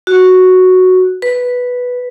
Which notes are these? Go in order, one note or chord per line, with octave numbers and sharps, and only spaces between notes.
F#4
B4